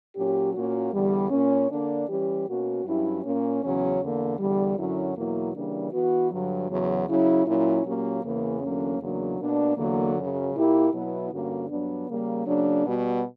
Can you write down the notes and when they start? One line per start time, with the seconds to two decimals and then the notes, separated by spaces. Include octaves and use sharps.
0.16 A#2 F#3 C#4 G4
0.54 A#2 A#3 C#4 F#4
0.92 E2 D3 G3
1.30 A#2 A#3 C#4
1.69 D3 A#3 D4
2.07 E3 G3 C#4 G4
2.46 B2 A#3 C#4 F#4
2.85 G2 F#3 C#4 E4 G4
3.23 A#2 A#3 C#4
3.62 E2 C#3 F#3 C#4
4.00 E2 D3 A#3
4.38 E2 D3 G3
4.76 F#2 D3 F#3 C#4 E4
5.15 E2 B2 F#3 A#3 E4
5.54 C#3 E3 G3 A#3 D4
5.92 E3 B3 F#4
6.31 G2 D3 F#3
6.69 E2 C#3 F#3
7.08 C#3 F#3 C#4 E4
7.46 A#2 F#3 C#4 E4
7.85 A#2 F#3 A#3 C#4 G4
8.23 E2 C#3 E3 A#3
8.61 E2 D3 F#3 A#3 C#4
8.99 E2 C#3 F#3 A#3 D4
9.39 B2 A#3 D4
9.76 E2 D3 F#3 A#3
10.15 F#2 C#3 F#3
10.53 A#2 A#3 E4 G4
10.92 B2 F#3 B3 E4
11.31 G2 D3 A#3 C#4 F#4
11.69 G2 F#3 B3 D4
12.07 C#3 G3 A#3
12.46 C#3 F#3 A#3 D4
12.85 B2 G3 B3 F#4